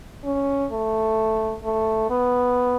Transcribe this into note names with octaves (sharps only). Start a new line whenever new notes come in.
C#4
A3
A3
B3